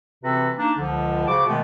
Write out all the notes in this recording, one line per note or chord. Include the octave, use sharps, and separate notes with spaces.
C3 E3 C4 F#4 A4 B4
A#3 D4 D#4
C#2 D3 F3
C#3 F#4 C5 D6
B2 D#3 G#3 A3 B3